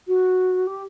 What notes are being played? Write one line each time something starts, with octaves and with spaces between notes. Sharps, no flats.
F#4
G4